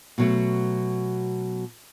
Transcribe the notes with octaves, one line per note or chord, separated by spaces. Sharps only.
B2 F#3 A3